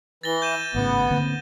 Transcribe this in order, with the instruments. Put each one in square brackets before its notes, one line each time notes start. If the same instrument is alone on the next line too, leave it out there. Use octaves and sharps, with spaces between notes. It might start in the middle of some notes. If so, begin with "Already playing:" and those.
[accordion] E3 [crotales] A6 A#6 G7
[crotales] G6 D#7 E7
[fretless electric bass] G#1 A2 C#3 [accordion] B3
[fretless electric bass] D3 A#3 C4